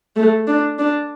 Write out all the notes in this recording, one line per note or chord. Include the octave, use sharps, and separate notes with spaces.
A3
D4
D4